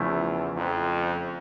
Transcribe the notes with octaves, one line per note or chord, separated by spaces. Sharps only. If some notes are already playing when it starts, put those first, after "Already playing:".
Already playing: E2 C#3 F3 A3 E4
F2